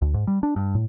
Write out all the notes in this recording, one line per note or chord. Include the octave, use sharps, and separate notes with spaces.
D2
G#2
G3
D4
G2
A2